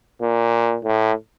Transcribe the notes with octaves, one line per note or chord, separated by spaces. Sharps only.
A#2
A2